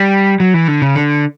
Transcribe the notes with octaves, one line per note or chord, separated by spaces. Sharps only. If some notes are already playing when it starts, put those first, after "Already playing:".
Already playing: G3
F#3
E3
D3
C#3
D3